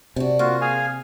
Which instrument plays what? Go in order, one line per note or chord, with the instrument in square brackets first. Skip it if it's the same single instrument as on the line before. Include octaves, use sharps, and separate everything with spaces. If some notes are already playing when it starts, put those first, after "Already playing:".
[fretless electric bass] C3 [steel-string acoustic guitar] D4 F#4
[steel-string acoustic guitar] A#3 [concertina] F4 F#4
[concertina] G#4 F5 G#5